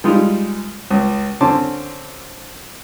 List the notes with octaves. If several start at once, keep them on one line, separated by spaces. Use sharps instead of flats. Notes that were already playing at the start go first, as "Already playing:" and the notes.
G3 G#3 D#4 F4
C#2
D3 C4 C#4 A5 C6 D6